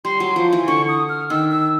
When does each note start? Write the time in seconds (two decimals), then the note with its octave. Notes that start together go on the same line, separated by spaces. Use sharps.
0.05 G3 C6
0.20 F#3
0.36 F3
0.52 E3
0.67 D3 C#6
0.89 D#6
1.09 F6
1.30 D#3 E6
1.51 E6